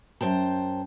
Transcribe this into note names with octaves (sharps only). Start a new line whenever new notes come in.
F#2 C5 G5 A5